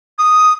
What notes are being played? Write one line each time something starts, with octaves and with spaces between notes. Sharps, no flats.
D#6